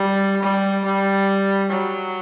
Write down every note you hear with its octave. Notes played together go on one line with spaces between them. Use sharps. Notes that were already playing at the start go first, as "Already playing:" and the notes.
Already playing: G3
G3
G3
F#3